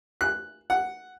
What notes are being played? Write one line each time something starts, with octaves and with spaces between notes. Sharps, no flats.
F#6
F#5